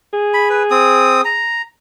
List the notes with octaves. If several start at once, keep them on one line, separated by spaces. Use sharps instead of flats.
G#4
B5
B4
C4 D#6
A#5